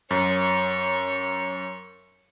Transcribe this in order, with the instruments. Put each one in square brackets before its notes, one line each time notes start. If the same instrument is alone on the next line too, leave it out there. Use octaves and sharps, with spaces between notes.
[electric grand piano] F#2 [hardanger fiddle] C#5